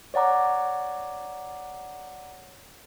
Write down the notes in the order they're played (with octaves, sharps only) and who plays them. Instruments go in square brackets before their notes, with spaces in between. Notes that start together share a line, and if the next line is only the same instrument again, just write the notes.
[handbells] C#5 D5 F#5 A#5 D6